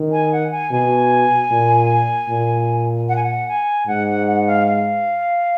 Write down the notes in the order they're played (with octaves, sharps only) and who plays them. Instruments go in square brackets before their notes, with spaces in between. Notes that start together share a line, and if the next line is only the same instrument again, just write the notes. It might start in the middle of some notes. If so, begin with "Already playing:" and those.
Already playing: [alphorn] D#3
[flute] G#5
F#5
G#5
[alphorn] B2 [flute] G#5
[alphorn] A#2
A#2
[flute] F#5
G#5
F#5
G#5
[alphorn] G#2 [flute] F#5
[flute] F#5
F#5
F5
F5